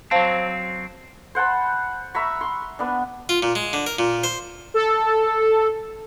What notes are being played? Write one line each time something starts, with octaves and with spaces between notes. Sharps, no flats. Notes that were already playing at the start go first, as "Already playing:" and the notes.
F#3 C4 C5 F5 A5
C5 F#5 A5 B5
E5 A#5 B5 C#6
C6 C#6
B3 D4
F4
A#2
G#3
D3
A#4
A#2
C5
A4